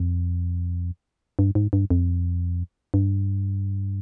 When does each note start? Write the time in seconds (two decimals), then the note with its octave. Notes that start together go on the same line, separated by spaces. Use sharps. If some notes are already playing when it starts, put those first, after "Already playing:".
Already playing: F2
1.39 G2
1.55 G#2
1.73 G2
1.90 F2
2.94 G2